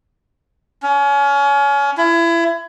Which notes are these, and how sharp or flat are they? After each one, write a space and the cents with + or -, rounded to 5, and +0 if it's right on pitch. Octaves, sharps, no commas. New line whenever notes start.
C#4 +30
E4 +30